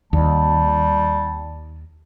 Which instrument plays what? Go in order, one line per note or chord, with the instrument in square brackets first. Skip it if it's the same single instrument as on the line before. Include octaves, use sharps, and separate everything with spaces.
[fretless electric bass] D#2 [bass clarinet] G3 [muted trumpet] A5